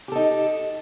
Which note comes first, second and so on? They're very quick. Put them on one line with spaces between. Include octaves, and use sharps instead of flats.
G4 A4 D#4